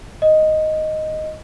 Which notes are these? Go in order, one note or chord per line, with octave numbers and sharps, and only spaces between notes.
D#5